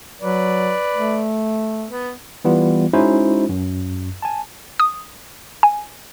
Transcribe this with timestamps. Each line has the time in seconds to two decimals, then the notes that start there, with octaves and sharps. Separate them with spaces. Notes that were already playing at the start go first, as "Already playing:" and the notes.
0.21 F#3 B4 D5
0.95 A3
1.88 B3
2.44 E3 G3 B3 F4
2.93 G#3 C#4 D#4 E4 F#4 C5
3.49 F#2
4.22 G#5 A5
4.80 D#6
5.63 G#5